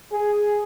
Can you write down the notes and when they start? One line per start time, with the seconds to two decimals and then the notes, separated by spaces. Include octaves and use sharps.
0.13 G#4